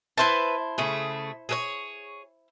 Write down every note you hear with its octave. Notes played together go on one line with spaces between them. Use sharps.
E4 B4 C5 E5 A5
C#3 A3 G#4
G#4 A4 C#5